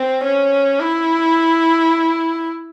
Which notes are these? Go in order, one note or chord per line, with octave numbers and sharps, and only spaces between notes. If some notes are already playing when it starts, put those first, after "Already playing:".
Already playing: C4
C#4
E4